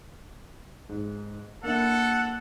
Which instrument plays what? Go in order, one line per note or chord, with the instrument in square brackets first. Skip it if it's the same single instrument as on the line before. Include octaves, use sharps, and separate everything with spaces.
[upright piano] G#2
[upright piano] A#3 D4 E4 [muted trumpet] A4 [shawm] F#5